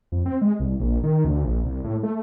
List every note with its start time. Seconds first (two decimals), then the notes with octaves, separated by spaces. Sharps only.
0.12 F2
0.26 C4
0.41 G#3
0.60 C2
0.80 A#1
1.04 D#3
1.25 D2
1.44 A#1
1.64 C2
1.84 A2
2.03 A3